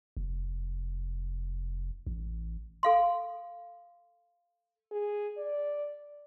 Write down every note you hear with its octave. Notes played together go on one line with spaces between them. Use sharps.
F1
A1
A4 F5 C6
G#4
D5